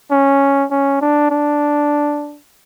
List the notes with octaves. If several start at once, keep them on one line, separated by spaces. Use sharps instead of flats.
C#4
C#4
D4
D4